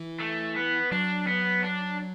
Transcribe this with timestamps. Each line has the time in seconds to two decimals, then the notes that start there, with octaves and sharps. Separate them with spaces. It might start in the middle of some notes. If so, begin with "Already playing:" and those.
Already playing: E3
0.20 A3
0.56 B3
0.92 F#3 D4
1.27 B3
1.64 D4